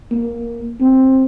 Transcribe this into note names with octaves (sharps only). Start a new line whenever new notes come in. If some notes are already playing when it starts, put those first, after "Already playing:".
A#3
C4